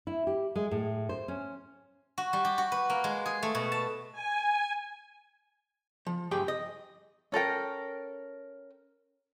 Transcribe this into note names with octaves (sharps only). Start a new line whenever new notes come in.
E4
G4
G#3
A2
C5
C#4
F#4
G3
G4
F#4
B4
A#3
G#3
G#4
A3
B2
A5
G#5
F3
D2 G2 G4 G#4 G5
D#5
C#4 A4 A#4 G5